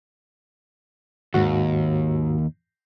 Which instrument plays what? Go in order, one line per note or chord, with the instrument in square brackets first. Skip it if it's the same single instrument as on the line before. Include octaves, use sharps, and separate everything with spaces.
[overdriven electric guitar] D#2 [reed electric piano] G#2 F#4